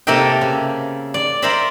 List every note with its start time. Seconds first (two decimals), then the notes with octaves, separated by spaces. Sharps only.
0.07 C3 A#3 A4 A#4 E5 G5
0.41 C#3
1.14 D5
1.42 A#4 C5 D5 E5 A#5 B5